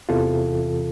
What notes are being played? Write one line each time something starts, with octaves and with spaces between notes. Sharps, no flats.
E2 C3 E3 F4 A4